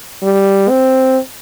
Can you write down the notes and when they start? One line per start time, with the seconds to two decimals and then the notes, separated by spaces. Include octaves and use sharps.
0.23 G3
0.69 C4